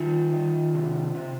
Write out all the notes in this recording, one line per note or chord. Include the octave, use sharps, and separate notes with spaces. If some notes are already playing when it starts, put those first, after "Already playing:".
Already playing: D#3 F4
D#3
C3
C3